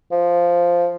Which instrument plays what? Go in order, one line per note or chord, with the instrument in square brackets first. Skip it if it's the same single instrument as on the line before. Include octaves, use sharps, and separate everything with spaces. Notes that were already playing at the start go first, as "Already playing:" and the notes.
[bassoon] F3